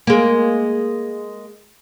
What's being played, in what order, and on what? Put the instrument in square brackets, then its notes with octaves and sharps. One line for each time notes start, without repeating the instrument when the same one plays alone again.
[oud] G#3 A#3